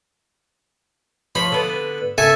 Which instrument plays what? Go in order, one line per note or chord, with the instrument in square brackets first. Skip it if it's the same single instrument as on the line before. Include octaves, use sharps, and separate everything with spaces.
[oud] F3 C5 C#5 [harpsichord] B5
[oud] D3 B3
[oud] C#3 [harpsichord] A4 E5 G#5